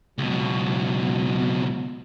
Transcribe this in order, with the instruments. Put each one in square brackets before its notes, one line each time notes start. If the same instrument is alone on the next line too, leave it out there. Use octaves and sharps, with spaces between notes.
[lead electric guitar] C#2 B2 [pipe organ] F#3